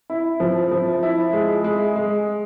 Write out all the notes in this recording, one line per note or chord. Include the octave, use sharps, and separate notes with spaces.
E4
F3
F3
E4
G#3
G#3
G#3